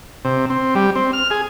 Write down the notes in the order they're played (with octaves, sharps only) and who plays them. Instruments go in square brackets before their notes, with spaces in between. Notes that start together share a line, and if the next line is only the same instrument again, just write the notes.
[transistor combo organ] C3
C4
G3
C4
F6
G#4